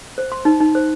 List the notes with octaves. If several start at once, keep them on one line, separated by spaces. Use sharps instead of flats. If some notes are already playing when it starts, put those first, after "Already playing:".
C5
C6
D#4
D#4
C5